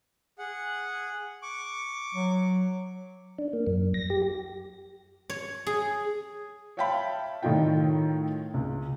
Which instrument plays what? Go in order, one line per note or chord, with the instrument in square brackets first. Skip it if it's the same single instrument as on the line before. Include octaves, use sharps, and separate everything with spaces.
[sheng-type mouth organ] G#4 F#5
C#6 D6
[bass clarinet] F#3
[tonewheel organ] D4
A#3
F#2
A#6
G4
[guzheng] C#5
G#4
[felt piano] C#5 E5 F5 G5 A5 B5
A2 D#3 A3 D#4 F4 G5
C#2